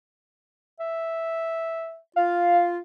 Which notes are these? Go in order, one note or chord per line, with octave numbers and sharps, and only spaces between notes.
E5
F4 F5